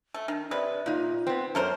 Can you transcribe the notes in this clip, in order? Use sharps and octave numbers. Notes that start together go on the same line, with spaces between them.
A3
D#3 D4
C3 B4 D5 D#5
A#2 D#4 F4
B3 C4
F#2 A4 A#4 C5 C#5